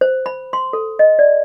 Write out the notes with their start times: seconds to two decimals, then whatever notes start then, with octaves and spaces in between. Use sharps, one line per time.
0.01 C5
0.26 B5
0.53 C6
0.73 A4
0.99 D#5
1.19 D5